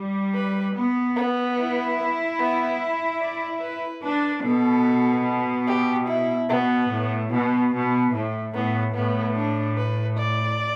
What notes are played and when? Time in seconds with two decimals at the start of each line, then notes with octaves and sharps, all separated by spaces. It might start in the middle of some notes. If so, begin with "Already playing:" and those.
Already playing: G3
0.35 B4
0.75 B3
1.17 B3
1.57 E4
2.40 B3
3.21 D5
3.62 B4
4.03 D4 B4
4.44 B2 A4
5.68 G4
6.08 E4
6.49 B2 B3
6.90 A2
7.32 B2 B3
7.73 B2
8.13 A2 E4
8.54 A2 B3
8.95 A2 B3
9.36 D4
9.78 B4
10.18 D5